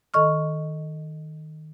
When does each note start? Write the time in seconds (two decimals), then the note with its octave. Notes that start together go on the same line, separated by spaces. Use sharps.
0.14 D#3 A4 D#5 C#6 F6